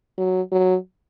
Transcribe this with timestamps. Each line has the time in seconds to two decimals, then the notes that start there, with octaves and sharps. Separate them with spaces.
0.18 F#3
0.52 F#3